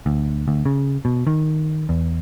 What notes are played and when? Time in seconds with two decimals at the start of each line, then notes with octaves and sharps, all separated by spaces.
0.06 D2
0.48 D2
0.65 C#3
1.05 B2
1.27 D#3
1.89 E2